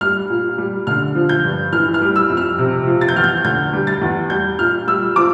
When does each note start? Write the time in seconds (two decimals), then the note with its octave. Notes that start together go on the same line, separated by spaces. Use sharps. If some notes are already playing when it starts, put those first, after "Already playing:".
0.01 G3 F6
0.30 A#2
0.58 G3
0.87 D3 F6
1.15 F3
1.29 G6
1.44 G2
1.73 E3 F6
1.94 F6
2.01 G3
2.16 E6
2.30 F2
2.37 F6
2.59 C3
2.87 F3
3.01 A6
3.09 G6
3.16 E2 F6
3.24 G6
3.45 D3 G6
3.73 G3
3.87 A6
4.02 E2
4.30 G3 G6
4.59 A#2 F6
4.87 G3 E6
5.16 F3 D6